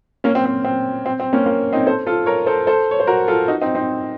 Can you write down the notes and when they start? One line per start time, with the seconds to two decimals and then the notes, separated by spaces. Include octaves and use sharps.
0.24 A#3 C#4
0.35 C4
0.45 C4
0.64 C4
1.06 C4
1.20 C4
1.33 A#3 C#4
1.46 A#3
1.73 C4 D#4
1.87 A4 C5
2.07 F4 A4
2.26 A#4 C#5
2.46 A4 C5
2.67 A4 C5
2.91 C#5
3.00 C5
3.07 F#4 A#4
3.28 F4 A4
3.48 D#4 F#4
3.61 C4 D#4
3.75 C4 D#4